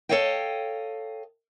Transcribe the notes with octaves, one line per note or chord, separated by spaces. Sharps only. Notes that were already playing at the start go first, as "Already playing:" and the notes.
A4 A#4 C#5 D#5 F5 G5